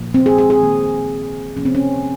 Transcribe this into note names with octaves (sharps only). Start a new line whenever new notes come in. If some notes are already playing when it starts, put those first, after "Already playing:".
Already playing: A#2 F3 A#3
C4
G#4
G#4
G#4
D#3 A#3
C3 F3 A#3 C#4
C4
C#4